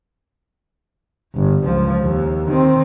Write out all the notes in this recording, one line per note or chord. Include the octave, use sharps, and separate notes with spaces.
G1
C#2 F3
D#2
D#3 C4